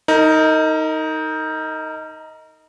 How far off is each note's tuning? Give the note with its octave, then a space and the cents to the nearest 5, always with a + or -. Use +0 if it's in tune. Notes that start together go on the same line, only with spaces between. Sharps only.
D#4 +15 A#4 -35